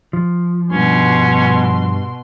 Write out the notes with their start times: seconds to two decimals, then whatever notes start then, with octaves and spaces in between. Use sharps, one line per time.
0.13 F3
0.71 G2 B2 C#4 C6